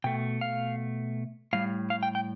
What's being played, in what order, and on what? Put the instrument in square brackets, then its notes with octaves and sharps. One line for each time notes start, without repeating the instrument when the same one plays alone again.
[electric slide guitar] B2 A3 G5
F5
A2 G3 F5
F5
G5
G5